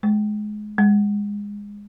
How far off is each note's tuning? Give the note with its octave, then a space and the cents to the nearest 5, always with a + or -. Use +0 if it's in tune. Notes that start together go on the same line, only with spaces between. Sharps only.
G#3 +25
G#3 -20